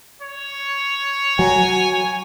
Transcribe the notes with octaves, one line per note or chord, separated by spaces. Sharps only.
C#5
F#3 G#5